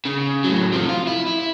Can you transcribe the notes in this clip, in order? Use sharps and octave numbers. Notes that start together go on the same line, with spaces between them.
C#3
A2 F#3
C3 F3
F4
E4
E4